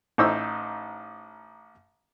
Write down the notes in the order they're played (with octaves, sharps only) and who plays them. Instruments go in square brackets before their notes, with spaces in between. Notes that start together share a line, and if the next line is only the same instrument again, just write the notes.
[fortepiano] A1 D#4 C5 C#6 D#6 E6